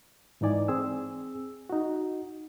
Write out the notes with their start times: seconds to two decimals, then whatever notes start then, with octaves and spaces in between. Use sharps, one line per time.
0.41 G#2 E3 D#4 D5 G#5
0.68 C4 G#4 E6
1.70 D#4 F#4